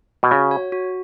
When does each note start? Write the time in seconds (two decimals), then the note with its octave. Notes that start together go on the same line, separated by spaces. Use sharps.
0.23 B2
0.31 C#3 F#4
0.51 C#5
0.72 F#4